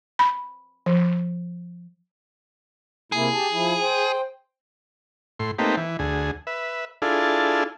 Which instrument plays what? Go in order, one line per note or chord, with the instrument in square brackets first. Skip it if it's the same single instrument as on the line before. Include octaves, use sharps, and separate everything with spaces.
[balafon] B5
F3
[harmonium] C3 A#3 E4 [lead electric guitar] G#4
[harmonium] G4 A5
F3 E4
C5 G5
[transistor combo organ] A2 C6
A3 A#3 C4 D#4 G4 B4
E3
D2 G#4
B4 E5
D4 E4 F4 G#4 A4